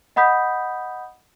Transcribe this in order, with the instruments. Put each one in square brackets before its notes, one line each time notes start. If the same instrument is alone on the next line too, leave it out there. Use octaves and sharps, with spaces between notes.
[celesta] D#5 F#5 B5 D#6 G6 B6